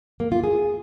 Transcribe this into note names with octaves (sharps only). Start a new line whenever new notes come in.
A#3
F4
G#4